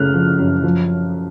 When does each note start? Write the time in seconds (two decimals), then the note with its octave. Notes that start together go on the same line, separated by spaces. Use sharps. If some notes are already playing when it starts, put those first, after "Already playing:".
Already playing: F#2 C#3 A3 F6 F#6
0.14 F3
0.39 F#2
0.64 F3